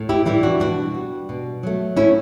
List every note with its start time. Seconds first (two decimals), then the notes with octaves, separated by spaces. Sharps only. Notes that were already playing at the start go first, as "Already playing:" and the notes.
Already playing: A2
0.09 E4 G4
0.26 E3 G3 E4 G4
0.43 D4 F#4
0.60 B2 D4 F#4
0.95 G3
1.29 B2
1.63 F#3 A3
1.97 A2 C#4 E4